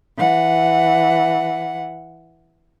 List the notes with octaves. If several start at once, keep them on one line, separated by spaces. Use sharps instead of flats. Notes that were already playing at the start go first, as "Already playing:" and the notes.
E3 F#5